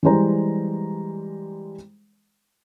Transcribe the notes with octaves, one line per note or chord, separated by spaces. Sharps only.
E3 G3 G#3 C5 A#5